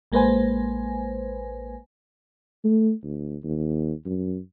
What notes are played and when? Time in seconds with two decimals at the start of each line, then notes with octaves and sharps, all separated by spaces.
0.12 A1 G#3 A#3 B4 C5 G#5
2.64 A3
3.03 D2
3.44 D#2
4.05 F#2